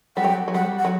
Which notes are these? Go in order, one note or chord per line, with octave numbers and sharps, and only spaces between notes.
G3 F#5
F#3 G5
F#3
G3 F#5
F#5
F#3